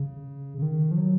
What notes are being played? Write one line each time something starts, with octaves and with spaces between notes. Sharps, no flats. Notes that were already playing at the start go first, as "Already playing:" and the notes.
Already playing: C#3
C#3
D#3
F3
F#3